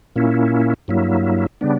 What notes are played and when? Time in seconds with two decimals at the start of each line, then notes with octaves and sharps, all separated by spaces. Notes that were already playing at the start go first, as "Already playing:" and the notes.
0.16 A#2 A#3 C#4 E4
0.88 G2 F#3 A#3 E4
1.61 C#3 G3 B3 D4